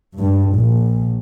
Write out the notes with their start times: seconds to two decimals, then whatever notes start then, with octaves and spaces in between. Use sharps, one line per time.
0.17 G2
0.53 A#1